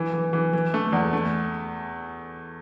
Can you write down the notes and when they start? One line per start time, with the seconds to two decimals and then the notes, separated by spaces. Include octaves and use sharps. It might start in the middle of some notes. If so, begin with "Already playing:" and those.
Already playing: E3
0.13 E3
0.33 E3
0.53 E3
0.74 A3
0.92 E2
1.13 A3